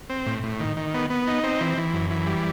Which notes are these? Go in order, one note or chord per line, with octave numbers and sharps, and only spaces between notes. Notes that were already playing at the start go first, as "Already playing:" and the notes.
C4
A2
A2
D#3
D#3
B3
B3
D#4
C4
E3
E3
F#2
E3
G3